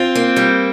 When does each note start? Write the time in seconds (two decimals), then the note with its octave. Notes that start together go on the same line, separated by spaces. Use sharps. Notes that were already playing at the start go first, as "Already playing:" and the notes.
Already playing: C4 F4
0.15 A#3
0.36 G3